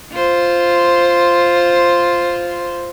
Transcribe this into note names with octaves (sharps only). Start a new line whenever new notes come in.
F4 C5